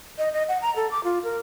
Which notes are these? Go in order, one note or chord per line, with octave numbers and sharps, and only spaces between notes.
D#5
D#5
F#5
A#5
A4
D6
F4
A#4